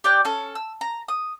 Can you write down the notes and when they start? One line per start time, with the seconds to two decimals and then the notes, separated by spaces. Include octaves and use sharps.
0.04 G4 D5 G5 F#6
0.25 C#4 A4
0.55 E6
0.81 A#5
1.08 D#6